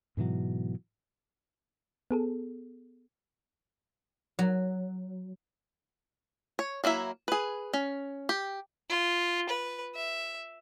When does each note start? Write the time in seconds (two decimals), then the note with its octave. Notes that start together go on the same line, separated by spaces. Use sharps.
0.17 G#2 B2 E3 F#3
2.11 B3 G#4 A4
4.39 F#3
6.59 C#5
6.84 F#3 A#3 E4 E5
7.28 G#4 B4
7.73 C#4
8.29 G4
8.90 F4
9.49 B4
9.95 E5